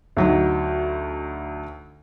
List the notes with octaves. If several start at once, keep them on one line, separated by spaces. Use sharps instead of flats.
D2 F#3 D#4